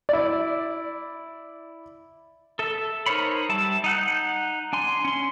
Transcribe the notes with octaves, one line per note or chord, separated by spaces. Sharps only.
E4 D5
A4 E5
D#4 A#4 C5 C#5 B5
G3 E5 A5
D#4 F#5 G6
D4 G#5 C6
C#4 C6